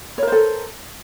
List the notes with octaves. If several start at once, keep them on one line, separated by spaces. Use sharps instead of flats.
A4 A#4 C5 C#5